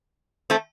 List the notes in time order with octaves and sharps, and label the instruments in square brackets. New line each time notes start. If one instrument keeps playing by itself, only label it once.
[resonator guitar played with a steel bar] A3 C4